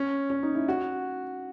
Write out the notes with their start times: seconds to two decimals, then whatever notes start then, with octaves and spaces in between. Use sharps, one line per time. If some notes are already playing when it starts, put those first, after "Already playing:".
Already playing: C#4
0.30 C#4
0.43 D#4
0.55 E4
0.68 F#4